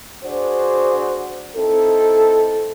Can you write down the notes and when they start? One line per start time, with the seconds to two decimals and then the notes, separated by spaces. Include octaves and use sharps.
0.24 D4 F#4 G#4 C5
1.56 C4 D#4 E4 A4